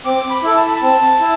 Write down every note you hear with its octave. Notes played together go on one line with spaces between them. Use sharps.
C4 D6
B5
E4 A4
A5
B5
A5
C4
E4